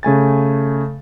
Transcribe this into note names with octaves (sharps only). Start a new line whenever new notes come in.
C#3 A3 G#5 A6